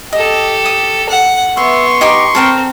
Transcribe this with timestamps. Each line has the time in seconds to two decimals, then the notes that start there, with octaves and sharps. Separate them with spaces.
0.13 G4 A4 D#5
0.65 D#6
1.09 F#5
1.57 B3 E5 C6 C#6
2.01 D#4 G4 D6
2.35 C4 A4 A#4 G5